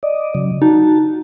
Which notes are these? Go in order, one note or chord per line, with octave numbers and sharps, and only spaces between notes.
D5 D#5
C#3 F#3
D#4 F#4 A5